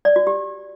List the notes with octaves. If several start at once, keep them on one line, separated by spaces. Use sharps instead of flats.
D5
F#4
G4